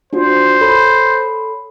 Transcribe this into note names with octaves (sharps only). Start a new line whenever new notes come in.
D4 F4 F#4 C5
A4 C#5 B5